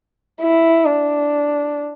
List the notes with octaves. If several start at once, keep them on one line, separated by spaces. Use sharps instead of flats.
E4
D4